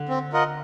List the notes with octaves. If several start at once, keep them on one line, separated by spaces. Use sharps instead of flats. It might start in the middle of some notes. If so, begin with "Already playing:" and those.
Already playing: D3
C4
F4 A#4 D#5 F#5